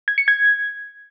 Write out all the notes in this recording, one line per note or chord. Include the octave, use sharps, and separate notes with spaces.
G#6
C#7
G#6